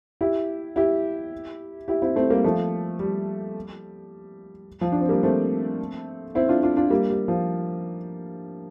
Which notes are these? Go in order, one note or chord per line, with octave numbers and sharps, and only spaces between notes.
E4 G4
E4 G4
E4 G4
C4 E4
A3 C4
G3 A#3
F3 A3
G3
F3
D4
C4
G3 A#3
A3 C4
C4 E4
D4 F4
D4 F4
D4 F4
G3 A#3
G3
F3